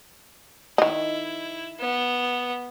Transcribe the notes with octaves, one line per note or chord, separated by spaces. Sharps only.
D#3 D#4 E4
B3